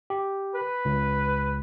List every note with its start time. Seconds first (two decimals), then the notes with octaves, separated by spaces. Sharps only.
0.10 G4
0.56 B4
0.85 C#2